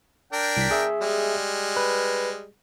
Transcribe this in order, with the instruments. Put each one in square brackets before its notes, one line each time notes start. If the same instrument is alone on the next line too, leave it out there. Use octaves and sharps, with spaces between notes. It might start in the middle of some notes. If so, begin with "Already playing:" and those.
[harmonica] D4 A#4 G5
[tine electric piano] C2 B6
G#4 E5
[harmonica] G3 G#3
[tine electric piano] B4